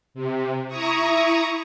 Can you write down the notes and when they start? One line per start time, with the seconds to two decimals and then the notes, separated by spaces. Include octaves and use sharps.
0.14 C3
0.68 E4 A#5 C#6 D#6